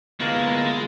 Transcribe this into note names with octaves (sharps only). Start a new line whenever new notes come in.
D2 G#3 A#3 B3 E4 F4 A#4